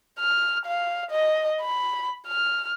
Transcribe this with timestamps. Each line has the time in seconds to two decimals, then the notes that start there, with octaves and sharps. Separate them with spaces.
0.19 F6
0.66 F5
1.11 D#5
1.61 B5
2.27 F6